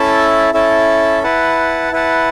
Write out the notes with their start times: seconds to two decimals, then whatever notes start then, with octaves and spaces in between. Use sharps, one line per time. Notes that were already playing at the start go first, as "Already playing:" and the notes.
Already playing: C#4 E4 A4 E5 A5
0.54 C#4 E4 A4 E5 A5
1.23 E4 B4 F#5 A5
1.92 E4 B4 F#5 A5